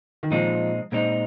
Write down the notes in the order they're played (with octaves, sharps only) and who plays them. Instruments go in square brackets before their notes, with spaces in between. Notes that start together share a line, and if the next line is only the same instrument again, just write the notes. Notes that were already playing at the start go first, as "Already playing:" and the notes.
[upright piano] D#3
[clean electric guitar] A#2 G#3 C4 D#4 [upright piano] F3
[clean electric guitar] A#2 G#3 C4 D#4